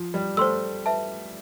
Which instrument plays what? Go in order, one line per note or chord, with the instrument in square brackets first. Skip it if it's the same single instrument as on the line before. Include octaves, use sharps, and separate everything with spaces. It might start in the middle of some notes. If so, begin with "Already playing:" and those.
Already playing: [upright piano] F3
G3
[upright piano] A3 [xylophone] C5 G5 C6 E6
[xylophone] B4 E5 A5